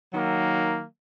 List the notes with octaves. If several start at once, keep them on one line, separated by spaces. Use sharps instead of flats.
D#3 F#3 A#3